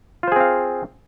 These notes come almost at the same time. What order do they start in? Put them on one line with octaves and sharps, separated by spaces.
F4 C5 G#4 C4 F5